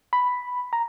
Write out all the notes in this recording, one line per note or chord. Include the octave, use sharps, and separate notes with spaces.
B5
A#5